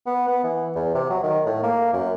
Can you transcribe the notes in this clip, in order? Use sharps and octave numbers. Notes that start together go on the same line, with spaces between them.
B3
B3
E3
E2
C3
F#3
D#3
A2
A#3
F#2